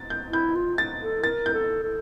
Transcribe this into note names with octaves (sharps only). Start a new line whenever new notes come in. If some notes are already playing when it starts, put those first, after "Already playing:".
Already playing: A6
G6
E4 G6
F4
A6
A4
A#4 A6
G6
A4
A4